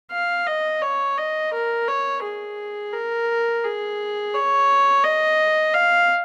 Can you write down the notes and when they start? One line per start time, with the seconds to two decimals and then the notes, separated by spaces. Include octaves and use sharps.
0.12 F5
0.47 D#5
0.82 C#5
1.18 D#5
1.53 A#4
1.88 C#5
2.23 G#4
2.93 A#4
3.64 G#4
4.34 C#5
5.03 D#5
5.74 F5